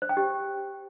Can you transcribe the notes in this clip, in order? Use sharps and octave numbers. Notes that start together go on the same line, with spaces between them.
C5
G5
G4